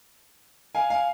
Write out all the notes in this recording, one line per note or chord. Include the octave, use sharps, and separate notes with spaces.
F5 G#5
F5 G#5